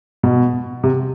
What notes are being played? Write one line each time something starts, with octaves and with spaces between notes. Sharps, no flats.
B2
C3